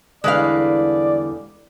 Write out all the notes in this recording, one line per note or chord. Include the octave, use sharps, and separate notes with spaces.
E2 D3 G3 G#3 B4 D5 F5